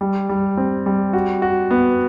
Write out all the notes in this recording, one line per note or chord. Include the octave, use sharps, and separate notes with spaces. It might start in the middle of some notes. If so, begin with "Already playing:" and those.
G3
G3
C4
G3
F#4
F#4
B3